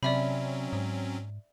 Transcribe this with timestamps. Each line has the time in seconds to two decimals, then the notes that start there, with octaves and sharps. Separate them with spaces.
0.03 C3 F#3 C4 C#4 D5 E5 B5
0.73 G#2